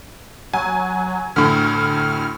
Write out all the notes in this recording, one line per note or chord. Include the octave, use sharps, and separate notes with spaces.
F#3 G#5
D2 A2 F6